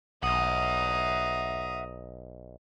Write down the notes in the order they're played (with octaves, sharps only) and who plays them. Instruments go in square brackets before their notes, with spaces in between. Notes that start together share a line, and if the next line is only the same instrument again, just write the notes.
[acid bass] B1 [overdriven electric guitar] E5 F#5 [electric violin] A#5 D#6